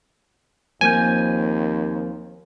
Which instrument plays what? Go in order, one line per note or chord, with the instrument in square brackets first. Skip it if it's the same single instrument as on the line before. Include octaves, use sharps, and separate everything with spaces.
[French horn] D#2 [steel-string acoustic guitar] F3 A#3 C4 [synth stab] G#5 [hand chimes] G6 G#6